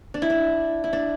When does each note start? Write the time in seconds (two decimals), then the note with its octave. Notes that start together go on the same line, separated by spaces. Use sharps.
0.14 D4
0.22 E4
0.30 D4
0.84 E4
0.93 D4